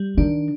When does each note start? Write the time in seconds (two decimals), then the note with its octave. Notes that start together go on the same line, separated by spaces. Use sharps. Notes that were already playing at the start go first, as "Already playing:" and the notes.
Already playing: G3
0.17 D#3 D4